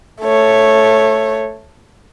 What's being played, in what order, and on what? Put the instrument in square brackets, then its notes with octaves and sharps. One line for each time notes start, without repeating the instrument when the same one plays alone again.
[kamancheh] A3 C#5